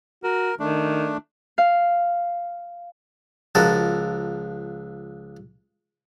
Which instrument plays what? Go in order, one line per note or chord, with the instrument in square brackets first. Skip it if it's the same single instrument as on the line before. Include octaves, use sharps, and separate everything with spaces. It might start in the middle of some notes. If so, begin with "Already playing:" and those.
[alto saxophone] F#4 [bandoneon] A#4
[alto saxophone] D#3 [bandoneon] A3 D4
[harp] F5
[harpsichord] C#2 F3 F#4 A4 A#4 A5